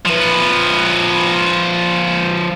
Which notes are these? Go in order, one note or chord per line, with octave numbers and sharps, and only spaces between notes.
F3 B4